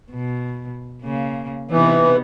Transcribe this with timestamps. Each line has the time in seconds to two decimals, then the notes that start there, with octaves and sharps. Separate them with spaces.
0.11 B2
1.02 C#3 A#3
1.71 C3 E3 B3 D#4